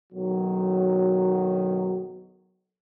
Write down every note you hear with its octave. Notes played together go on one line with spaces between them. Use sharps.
F#1 B1 D#3 F#3